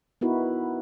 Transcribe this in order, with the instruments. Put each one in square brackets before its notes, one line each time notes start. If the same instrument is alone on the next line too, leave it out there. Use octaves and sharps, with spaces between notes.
[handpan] B3 D#4 E4 F#4 A#4 B4